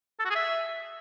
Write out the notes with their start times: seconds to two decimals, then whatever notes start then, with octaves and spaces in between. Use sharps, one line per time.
0.20 A4
0.25 F#4
0.30 G#4
0.36 E5